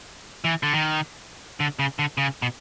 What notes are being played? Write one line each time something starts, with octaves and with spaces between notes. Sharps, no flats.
E3
D3
D#3
D3
C#3
D3
C#3
B2